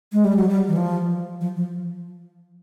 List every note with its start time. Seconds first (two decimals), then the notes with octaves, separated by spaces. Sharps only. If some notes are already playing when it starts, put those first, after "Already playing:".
0.13 G#3
0.24 G3
0.36 F#3
0.49 G3
0.68 E3
0.77 F3
1.41 F3
1.56 F3